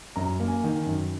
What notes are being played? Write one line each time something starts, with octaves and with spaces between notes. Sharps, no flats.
F#2 A#5
A#3
G#5
D#3
F#2